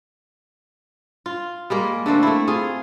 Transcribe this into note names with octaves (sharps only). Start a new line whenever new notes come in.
F4
G3 G#3 A#3
D3 A3 A#3 C4
A3 E4
F4 G#4